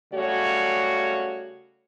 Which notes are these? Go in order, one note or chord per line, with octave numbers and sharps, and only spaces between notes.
C#3 G3 A3 F#4 C#5